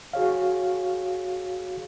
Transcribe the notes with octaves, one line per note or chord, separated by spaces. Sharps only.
F#4 G#4 C#5 F5